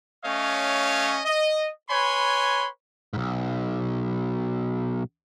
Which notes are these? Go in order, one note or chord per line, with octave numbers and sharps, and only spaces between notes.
A3 C#4 C#5 D#5 F5
D#5
B4 C#5 G#5 B5 C6
B1 G#2